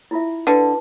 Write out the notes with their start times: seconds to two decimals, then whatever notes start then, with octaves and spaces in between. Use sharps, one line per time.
0.11 E4 F4 E5
0.47 D3 B4